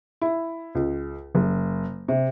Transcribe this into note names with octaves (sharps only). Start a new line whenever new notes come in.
E4
C#2
F#1
C3